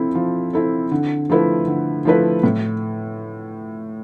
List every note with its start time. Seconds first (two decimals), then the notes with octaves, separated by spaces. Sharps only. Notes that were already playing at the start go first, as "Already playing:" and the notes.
Already playing: F3 C4 E4 A4
0.15 F3
0.53 C4 E4 A4
0.91 D3
1.30 F3 A3 E4 B4
1.67 D3
2.05 F3 A3 E4 B4
2.43 A2